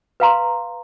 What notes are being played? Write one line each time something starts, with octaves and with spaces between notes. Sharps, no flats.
B4 F5 A#5 C6